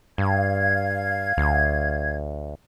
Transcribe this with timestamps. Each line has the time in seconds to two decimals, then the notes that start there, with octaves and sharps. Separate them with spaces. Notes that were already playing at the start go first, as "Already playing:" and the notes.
0.18 G2 F5 G#6
1.37 D2